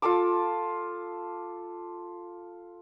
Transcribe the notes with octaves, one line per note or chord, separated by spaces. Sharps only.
F4 A4 A5 D6